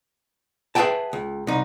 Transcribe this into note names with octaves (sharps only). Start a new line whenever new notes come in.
G#4 B4 D5 E5 G5 A5
C#2
C2 D#4